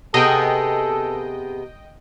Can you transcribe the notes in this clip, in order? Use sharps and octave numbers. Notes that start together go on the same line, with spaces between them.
C3 B3 G#4 A4 D#5 G5